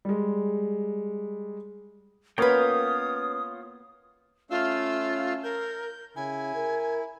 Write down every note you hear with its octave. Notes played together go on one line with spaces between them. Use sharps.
G3 G#3
A#3 B3 C#4 F4 B4 C#5 G5 D#6
A3 C#4 F4 F5 E6
A#4 G6
C#3 E4 G#5
A#4